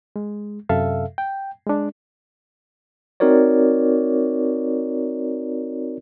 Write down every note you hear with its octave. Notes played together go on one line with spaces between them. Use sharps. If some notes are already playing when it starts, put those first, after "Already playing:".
G#3
F#2 C3 A4 E5 F5
G5
G#3 D4
C4 D#4 F#4 A#4 C#5 D5